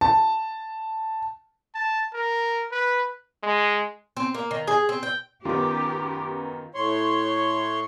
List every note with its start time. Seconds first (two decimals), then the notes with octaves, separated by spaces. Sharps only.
0.01 A5
1.74 A5
2.14 A#4
2.72 B4
3.43 G#3
4.17 C4
4.34 A#3
4.51 D#3
4.67 G#4
4.89 C4
5.03 G5
5.45 F#2 D#3 B3 F4 G4
6.75 A2 C#5 C6